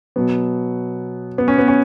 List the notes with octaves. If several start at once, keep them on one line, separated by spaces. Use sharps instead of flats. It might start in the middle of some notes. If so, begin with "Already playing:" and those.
B2 F#3 B3
B3
C#4
B3
C#4